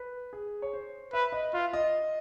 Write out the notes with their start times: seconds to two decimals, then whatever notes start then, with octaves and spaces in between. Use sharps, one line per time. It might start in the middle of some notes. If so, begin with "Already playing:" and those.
Already playing: B4
0.33 G#4
0.62 C#5
0.73 C5
1.13 B4 E5
1.32 D#5
1.53 F4 E5
1.73 D#5